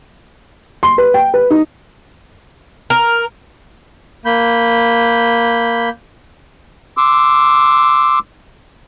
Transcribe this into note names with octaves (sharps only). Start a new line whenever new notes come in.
C6
B4
G5
B4
D#4
A#4
A#3 B5 G6
C6 D6 E6